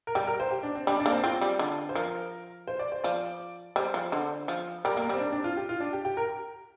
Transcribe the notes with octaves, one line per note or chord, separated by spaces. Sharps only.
A#4
G3 G4
A#4
C5
G4
D4
C4
G3 D4
D4
A#3
C4
C4 F4
G3
D3
C5
F3 A#4
C5
D5
C5
F3 D5
G3 C5
F3
D3
F3
G3 A#4
G4
A#3
A#4
G3 C4
D4
D4
F4
G4
F4
D4
G4
G4
A#4